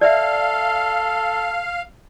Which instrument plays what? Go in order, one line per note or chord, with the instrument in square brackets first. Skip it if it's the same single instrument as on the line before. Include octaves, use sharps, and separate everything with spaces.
[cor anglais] A4 [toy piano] D5 E5 [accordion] F5